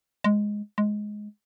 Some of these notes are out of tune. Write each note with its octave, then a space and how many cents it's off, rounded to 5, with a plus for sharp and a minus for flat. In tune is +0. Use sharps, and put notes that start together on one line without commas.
G#3 +0
G#3 +10